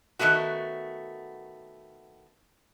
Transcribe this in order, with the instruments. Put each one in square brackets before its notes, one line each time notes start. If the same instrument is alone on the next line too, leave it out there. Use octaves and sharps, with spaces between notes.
[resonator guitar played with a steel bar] D#3 E3 A3 B3 F#4